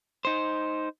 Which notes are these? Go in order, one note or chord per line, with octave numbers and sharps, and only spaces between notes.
D#4 C5